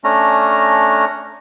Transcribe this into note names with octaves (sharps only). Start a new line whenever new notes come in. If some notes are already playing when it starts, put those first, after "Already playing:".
A3 C#4 D4 A#5